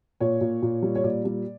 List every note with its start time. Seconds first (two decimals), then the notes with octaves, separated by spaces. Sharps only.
0.21 A#2 C#5
0.41 A#2
0.62 A#2
0.82 G3
0.95 C#5
1.04 A#2 D5
1.25 G3